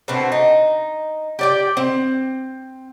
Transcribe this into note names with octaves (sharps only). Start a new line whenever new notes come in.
B2 D3 A3 C4
D#4
G4 D5 G5
C4